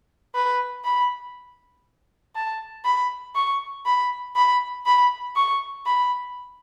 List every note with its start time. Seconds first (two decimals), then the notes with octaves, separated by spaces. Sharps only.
0.35 B4
0.85 B5
2.36 A5
2.85 B5
3.36 C#6
3.86 B5
4.36 B5
4.86 B5
5.36 C#6
5.86 B5